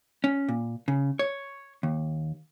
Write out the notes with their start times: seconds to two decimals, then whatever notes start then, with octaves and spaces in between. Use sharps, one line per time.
0.24 C#4
0.49 A#2
0.88 C#3
1.19 C#5
1.83 D#2